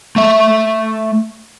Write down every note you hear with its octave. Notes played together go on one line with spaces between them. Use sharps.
A3 E5